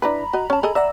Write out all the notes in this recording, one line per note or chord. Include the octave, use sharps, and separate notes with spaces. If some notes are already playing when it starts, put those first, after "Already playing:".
D4 E4 B4 A#5 B5
F#4 D#5
C#4 A5
G#4 A4 D#5
D5 E5 F#5 A#5 E6